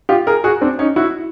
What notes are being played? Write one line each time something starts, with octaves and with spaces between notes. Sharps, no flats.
F4 G4
G#4 A#4
F#4 G#4
C4 D4
C#4 D#4
E4 F#4